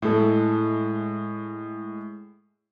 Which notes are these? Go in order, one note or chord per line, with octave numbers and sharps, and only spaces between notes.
A2 G#3 E4 A4